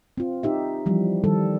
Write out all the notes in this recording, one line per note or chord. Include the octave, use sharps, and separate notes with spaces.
C4 F4
D#4 G4 E5
E3 F3 G3
D#3 G3 A4